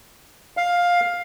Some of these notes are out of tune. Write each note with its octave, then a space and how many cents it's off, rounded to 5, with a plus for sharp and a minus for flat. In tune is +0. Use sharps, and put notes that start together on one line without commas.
F5 +10